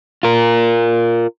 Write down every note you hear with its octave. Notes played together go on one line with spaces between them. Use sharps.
F4 A#4